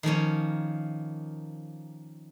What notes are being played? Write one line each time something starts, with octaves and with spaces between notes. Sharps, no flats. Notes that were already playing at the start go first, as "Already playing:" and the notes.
D#3 F3 A#3 C#4